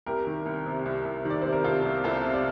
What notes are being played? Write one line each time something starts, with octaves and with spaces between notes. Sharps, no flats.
C2 G4 A#4
D#3
C2
C3
C2
C2
D#3
D5
C3 C5
A#4
C3 F4 A4
C2
C2 F4 A4
C3
D5